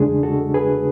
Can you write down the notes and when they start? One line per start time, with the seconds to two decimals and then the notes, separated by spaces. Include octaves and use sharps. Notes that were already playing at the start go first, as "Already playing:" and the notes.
Already playing: E2 C#3 G#3 D4 G#4
0.23 F#4 A4
0.54 G#4 B4